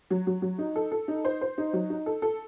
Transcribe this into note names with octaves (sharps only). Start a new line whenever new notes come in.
F#3
F#3
F#3
D#4
A4
A4
D#4
C5
C5
D#4
F#3
D#4
A4
A4